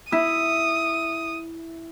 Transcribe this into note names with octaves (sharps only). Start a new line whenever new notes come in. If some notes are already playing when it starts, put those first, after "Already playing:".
E4 D#6